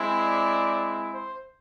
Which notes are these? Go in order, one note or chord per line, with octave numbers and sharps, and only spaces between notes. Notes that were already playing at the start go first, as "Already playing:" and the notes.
Already playing: G#3 C4 E4
D5
C5